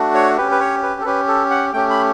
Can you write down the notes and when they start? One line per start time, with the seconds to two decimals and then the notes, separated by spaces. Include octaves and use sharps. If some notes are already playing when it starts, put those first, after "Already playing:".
Already playing: A3 D4 F#4
0.14 C#5
0.37 C#4 G4 B4
0.52 B4
0.60 C#5
0.83 B4
1.01 A4
1.05 C#4 G4 B4
1.28 A4
1.50 F#5
1.73 A3 C#4 G4 G5
1.90 B5